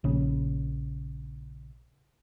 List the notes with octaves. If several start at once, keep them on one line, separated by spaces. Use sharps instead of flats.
A#1 C#3